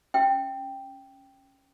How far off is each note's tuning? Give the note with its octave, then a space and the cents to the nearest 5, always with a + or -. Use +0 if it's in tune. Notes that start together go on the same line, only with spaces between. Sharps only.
C#4 -10 E5 +0 G5 +0